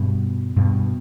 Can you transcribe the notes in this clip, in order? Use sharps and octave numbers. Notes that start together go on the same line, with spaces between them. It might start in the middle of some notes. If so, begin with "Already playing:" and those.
Already playing: G2 B2
G2 B2